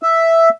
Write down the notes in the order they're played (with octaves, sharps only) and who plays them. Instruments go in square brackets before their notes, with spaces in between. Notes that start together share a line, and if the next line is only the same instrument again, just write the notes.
[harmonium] E5